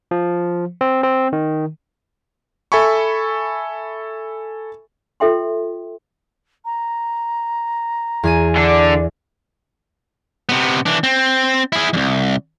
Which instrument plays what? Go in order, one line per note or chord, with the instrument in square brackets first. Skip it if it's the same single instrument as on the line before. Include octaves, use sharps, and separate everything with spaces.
[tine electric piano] F3
C4
C4
D#3
[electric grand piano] A4 E5 G#5 B5 C#6
[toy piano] F4 A4 E5 G5 C6
[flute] A#5
[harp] E2 G#5 D#7
[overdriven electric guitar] D3 D4 [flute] D5
[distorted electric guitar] C3 B3
E3 D4
C4
E4 G#4
C2 F2